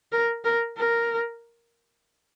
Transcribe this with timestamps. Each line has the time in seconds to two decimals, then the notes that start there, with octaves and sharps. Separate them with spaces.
0.12 A#4
0.44 A#4
0.78 A#4